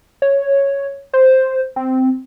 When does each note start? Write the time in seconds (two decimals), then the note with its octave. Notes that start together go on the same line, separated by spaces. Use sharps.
0.22 C#5
1.13 C5
1.76 C4